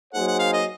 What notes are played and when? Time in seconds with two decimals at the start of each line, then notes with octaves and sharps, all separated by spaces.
0.14 F#3 A#3 D#4 G#4 C5 F#5
0.27 F#5
0.39 F5
0.53 D#5